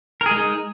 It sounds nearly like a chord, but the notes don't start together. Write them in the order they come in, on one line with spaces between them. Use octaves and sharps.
A#4 G#4 G#3 D#4